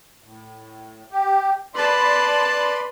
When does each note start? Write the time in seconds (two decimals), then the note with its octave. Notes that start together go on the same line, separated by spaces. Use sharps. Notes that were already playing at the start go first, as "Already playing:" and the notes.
0.24 A2
1.12 G4
1.75 B4 D5 A5 B5 C6